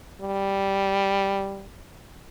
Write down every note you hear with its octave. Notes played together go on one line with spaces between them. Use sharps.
G3